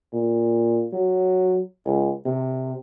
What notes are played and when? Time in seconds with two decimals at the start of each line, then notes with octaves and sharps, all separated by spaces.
0.13 A#2
0.93 F#3
1.86 C#2
2.26 C3